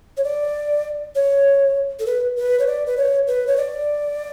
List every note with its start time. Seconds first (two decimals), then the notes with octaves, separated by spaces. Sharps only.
0.17 C#5
0.24 D5
1.15 C#5
1.99 A4
2.06 B4
2.36 B4
2.59 C#5
2.67 D5
2.86 B4
2.97 C#5
3.27 B4
3.47 C#5
3.57 D5